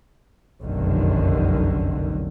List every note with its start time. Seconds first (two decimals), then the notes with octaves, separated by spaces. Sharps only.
0.61 F1 B1 F#2 D3 D#3